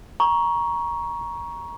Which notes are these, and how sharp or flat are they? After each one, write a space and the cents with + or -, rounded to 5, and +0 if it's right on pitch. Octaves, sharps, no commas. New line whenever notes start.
A#5 +20 C#6 +5